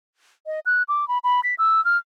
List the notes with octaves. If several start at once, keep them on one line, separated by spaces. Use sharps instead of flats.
D#5
F#6
D6
B5
B5
B6
E6
F6